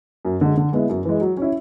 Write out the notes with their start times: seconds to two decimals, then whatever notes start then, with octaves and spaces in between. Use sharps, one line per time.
0.25 F#2
0.41 D3 G#3
0.57 D3
0.73 G#3 B3 E4
0.89 F#2
1.05 E3 G#3
1.21 F#3
1.37 C#4 E4